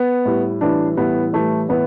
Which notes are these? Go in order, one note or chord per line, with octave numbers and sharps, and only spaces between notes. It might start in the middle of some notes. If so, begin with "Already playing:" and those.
Already playing: B3
A2 G3
A2 E3 G3 D4
A2 E3 G3 B3
A2 E3 G3 A3
A2 E3 B3